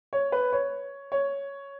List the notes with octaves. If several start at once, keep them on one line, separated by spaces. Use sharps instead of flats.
C#5
B4
C#5
C#5